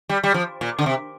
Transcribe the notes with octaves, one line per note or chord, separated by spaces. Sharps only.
G3
G3
F3
A#2
D3
C3